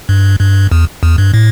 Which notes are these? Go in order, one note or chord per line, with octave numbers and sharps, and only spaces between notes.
G2
G2
E2
E2
G2
A2